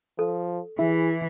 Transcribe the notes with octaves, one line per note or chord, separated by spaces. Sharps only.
F3 A4
E3 E4 G#4